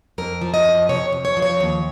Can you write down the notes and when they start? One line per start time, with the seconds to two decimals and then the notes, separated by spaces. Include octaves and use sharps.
0.18 F2 A#4
0.41 F3
0.54 D#5
0.65 F2
0.89 C3 C#5
1.13 F2
1.25 C#5
1.37 F3
1.42 C#5
1.60 D#2 C#5